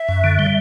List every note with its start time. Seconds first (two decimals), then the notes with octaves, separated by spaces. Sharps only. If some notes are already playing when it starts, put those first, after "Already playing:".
Already playing: E5
0.09 F#2
0.24 D3
0.39 G3